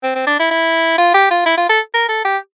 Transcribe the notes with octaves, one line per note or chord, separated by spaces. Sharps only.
C4
C4
D4
E4
E4
F4
G4
F4
E4
F4
A4
A#4
A4
G4